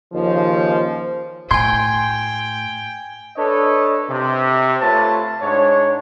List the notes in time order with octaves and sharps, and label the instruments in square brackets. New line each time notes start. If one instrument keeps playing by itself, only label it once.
[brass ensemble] D#2 C#3 F3
[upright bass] A2 [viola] G5 [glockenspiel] G#5 G#6 [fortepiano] C6
[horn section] D4 A4 B4 C#5 D#5
C3
A3 F4 B4 C#5 A5
G#2 D4 C#5